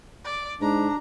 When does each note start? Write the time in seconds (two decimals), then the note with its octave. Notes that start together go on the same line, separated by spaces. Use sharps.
0.25 D5
0.61 G#2 D4 A#5